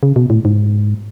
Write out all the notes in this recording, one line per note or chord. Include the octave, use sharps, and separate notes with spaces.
C#3
B2
A2
G#2